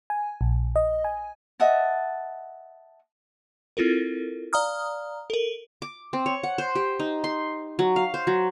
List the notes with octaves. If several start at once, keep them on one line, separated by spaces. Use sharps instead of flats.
G#5
A#1
D#5
G#5
D#5 E5 F#5 A5
C4 E4 F4 A4 A#4
D5 F5 A#5 D#6 F6
A4 A#4
D6
C4
C#5
F#5
C5
G4
D#4
C6
F#3
F5
C5
F#3